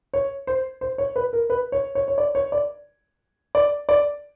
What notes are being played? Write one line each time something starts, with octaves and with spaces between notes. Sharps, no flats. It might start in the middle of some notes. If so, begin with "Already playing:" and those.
C#5
C5
C5
C#5
B4
A#4
B4
C#5
C#5
C#5
D5
C#5
D5
D5
D5